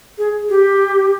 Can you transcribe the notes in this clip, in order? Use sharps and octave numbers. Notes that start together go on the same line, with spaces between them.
G#4
G4